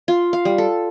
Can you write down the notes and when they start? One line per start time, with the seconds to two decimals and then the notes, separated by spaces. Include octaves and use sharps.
0.08 F4
0.33 F5
0.45 G3
0.58 A4